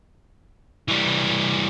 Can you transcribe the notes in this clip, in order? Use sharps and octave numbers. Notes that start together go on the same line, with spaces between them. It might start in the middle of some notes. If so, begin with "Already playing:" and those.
E3 G3